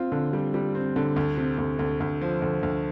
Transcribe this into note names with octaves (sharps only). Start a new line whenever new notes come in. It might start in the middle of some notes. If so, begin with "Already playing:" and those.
Already playing: C4 F4
D3
G3
G3
C4
D3
D2
C3
D2
D2
D2
F3
D2
D2